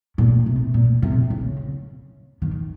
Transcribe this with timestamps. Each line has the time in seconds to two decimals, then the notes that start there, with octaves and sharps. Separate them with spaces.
0.18 A#2
0.46 C3
0.74 A#2
1.02 C3
1.30 C#3
2.42 D#3